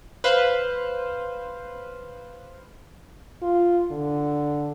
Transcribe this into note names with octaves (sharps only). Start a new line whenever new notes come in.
B4 C5 F5
F4
D3